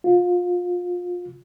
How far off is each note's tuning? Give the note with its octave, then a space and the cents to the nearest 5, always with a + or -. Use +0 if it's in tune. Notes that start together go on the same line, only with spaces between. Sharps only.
F4 +25